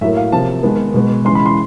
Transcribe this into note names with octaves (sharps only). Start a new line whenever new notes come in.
A2 F#3 A#3 E5
F5
C3 F3 A#3 A5
D#3 G#3 B3
B2 G#3 B3
C#3 E3 G#3 C6
B5
C6